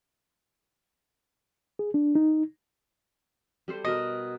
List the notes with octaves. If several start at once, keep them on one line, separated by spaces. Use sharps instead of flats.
G#4
D4
D#4
G3 A4 C5
B2 A#4 D#5